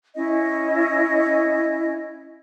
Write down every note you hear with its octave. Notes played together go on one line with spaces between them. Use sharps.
C#4 E4 D#5